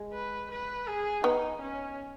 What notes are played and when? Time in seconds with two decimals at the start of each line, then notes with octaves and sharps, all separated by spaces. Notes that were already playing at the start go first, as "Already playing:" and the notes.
Already playing: G#3
0.13 B4
0.51 B4
0.87 G#4
1.24 B3 D#4
1.62 C#4